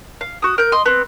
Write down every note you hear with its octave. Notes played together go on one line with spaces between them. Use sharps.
F5
F#4 D#6
A#4 G6
D#5 C6
B3 C4